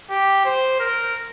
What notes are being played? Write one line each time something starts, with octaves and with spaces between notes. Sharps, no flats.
G4
C5
A#4